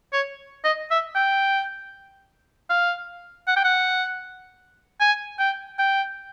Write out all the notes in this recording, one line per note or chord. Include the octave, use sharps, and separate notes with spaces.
C#5
D#5
E5
G5
F5
F#5
G5
F#5
G#5
G5
G5